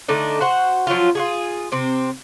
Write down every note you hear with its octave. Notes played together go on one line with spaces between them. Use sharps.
D3 A3 D4 D#4
F#4 C5 F#5
F3 F#3 C#4 F4
F4 F#4 G#4
C3 C4